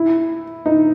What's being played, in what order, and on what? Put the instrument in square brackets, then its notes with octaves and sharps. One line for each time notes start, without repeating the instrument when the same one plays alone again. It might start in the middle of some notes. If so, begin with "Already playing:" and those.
Already playing: [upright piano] E4
D#4